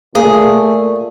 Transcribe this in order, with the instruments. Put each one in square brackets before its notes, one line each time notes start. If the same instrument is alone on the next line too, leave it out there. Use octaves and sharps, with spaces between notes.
[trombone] A#2 [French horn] A3 [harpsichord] A#3 [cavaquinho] G#4